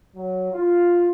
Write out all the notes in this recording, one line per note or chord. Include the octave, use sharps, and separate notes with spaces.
F#3
F4